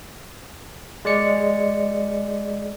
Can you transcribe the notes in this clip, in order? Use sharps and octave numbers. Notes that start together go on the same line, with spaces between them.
G#3 D5 C#7